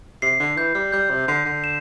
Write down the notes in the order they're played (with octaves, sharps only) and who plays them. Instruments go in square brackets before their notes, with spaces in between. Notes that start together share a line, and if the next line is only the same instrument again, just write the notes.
[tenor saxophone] C3 [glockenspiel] C7
[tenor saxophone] D3
[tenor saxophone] E3 [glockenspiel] G6
[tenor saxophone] G3
[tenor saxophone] G3 [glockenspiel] G6
[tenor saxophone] C3
[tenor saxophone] D3 [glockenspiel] C7
[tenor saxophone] D3
[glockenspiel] E7